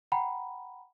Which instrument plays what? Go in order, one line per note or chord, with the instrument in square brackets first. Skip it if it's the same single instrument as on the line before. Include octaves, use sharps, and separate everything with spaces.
[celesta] F#5 G5 A#5 B5